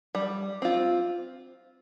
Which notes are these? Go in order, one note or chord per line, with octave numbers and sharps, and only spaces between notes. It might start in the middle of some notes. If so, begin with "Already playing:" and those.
G3
C4 F4